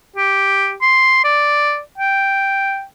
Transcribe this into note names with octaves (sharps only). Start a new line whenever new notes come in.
G4
C6
D5
G5